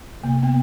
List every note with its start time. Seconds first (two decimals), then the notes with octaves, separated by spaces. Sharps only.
0.23 C3 A#3
0.43 B3